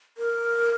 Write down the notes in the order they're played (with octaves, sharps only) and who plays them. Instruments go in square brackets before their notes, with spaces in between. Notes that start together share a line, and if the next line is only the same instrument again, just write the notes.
[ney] A#4